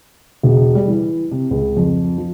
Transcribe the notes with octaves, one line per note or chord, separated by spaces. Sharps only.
E1
G3
E3
C3
C#2
F2
F3